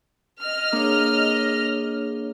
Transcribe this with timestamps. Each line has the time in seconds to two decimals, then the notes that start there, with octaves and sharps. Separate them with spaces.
0.44 D#5 F6
0.72 A#3 D4 G#4 C#5